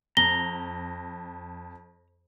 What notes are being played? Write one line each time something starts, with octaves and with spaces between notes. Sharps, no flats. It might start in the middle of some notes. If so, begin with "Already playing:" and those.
F2 A#5 G7